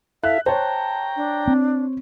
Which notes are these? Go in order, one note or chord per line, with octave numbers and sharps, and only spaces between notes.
E4 A4 E5 F5 F#6
C5 C#5 G5 A5 A#5
D4
C4